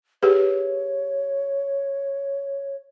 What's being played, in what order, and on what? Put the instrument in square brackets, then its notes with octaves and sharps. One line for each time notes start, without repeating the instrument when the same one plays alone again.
[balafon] G4 G#4 B4 [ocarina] C#5